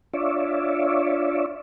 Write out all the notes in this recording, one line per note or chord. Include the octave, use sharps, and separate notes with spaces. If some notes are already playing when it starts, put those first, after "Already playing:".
D4 F4 C#5 D5 E5